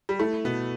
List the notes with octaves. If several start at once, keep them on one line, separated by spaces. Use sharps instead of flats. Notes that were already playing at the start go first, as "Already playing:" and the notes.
G3
A3 E4
B2 B3